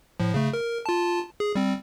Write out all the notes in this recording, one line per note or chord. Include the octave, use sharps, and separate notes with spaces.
A2 F3
C#3 A3
A#4
F4 A5
G#4
G3 C4